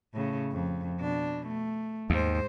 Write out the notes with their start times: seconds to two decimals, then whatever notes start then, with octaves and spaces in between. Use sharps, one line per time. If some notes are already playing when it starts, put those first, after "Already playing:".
0.15 A2 C#3
0.52 F2
1.00 B2 D4
1.47 A3
2.10 D#2 G#2 C5